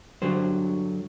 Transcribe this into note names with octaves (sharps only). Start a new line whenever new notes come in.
G2 D3 F#3 C5